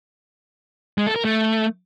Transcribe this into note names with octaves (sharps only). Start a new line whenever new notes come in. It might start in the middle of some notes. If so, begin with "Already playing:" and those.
G#3
A4
A#4
A3